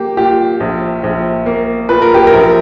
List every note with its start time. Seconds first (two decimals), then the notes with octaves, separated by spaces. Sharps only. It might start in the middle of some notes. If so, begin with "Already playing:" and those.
Already playing: A#3 G4
0.17 A#2 G4
0.60 A#1
1.04 A#1
1.46 A#3
1.89 A#2 B4
2.02 A#4
2.14 G4
2.27 A#4
2.32 A#1